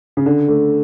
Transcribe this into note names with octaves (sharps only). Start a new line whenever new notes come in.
C#3
D3
A3